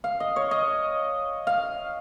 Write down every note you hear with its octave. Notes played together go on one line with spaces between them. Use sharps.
F5
D#5
C#5
D#5
F5